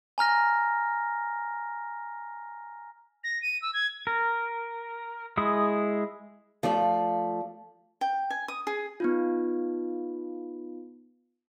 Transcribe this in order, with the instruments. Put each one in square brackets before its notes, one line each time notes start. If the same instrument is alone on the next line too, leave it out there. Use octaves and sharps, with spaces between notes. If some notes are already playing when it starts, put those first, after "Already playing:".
[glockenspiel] G#5 A#5 F6 A#6
[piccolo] A#6
D#7
E6
G#6
[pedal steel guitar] A#4
G#3 E4 G#4 D#6
[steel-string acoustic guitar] F3 A3 F4 D5
[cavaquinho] G5
G#5
D#6
G#4
[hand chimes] B3 D#4 F4